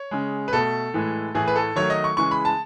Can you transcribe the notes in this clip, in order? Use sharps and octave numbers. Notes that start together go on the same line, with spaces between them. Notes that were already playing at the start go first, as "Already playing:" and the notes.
Already playing: C#5
C#3 G#3
B4
B2 A3 A4
A2 E3 G#3
A2 E3 A3 G#4
B4
A4
D#3 F#3 A3 C#5
D#5
C#6
C#3 E3 G#3 C#6
B5
A5